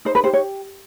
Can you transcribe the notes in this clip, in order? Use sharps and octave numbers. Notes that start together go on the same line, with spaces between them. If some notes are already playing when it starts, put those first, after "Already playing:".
D#4 C5
B4
G4 C5
C#5